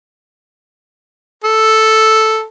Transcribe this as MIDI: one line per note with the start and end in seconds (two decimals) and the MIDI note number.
1.44 2.45 69